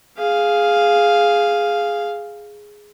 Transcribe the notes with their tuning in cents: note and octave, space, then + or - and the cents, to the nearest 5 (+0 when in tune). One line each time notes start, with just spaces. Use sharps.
G#4 +0 F5 +0